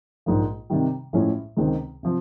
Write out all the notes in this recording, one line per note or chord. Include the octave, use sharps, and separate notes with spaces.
A#1 G#2 F3 A#3
C3 D#3 G3
A2 F3 G#3 C#4 E4
C#2 C3 D#3 G#3 C4
C3 F3